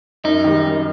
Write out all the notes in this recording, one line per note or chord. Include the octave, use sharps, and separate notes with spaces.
F#2 D#4
D#3 G3
F#2